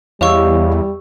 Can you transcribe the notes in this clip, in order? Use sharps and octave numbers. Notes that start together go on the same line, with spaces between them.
E2 G3 G4 C#5 D#5 F5 C#6 E6